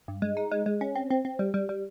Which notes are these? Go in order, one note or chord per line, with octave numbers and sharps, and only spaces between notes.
G2
G#3
D#4
G#3
G#3
C#4
C4
C4
C4
G3
G3
G3